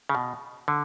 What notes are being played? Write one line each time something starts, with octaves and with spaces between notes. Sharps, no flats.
C#3
B2
D3